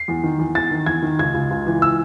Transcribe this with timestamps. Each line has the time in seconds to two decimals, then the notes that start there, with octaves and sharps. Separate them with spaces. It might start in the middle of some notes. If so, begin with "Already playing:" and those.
Already playing: C7
0.08 E2
0.24 D#3
0.39 E2
0.55 E2 A6
0.71 D#3
0.86 E2 G#6
1.03 D#3
1.19 C#2 G#6
1.34 C#2
1.51 C#2
1.67 E3
1.82 E6